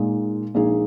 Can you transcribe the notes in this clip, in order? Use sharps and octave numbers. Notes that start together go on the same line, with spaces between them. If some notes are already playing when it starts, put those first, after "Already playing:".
Already playing: A#2 G#3 D#4
A#1 A#2 G#3 D#4 G#4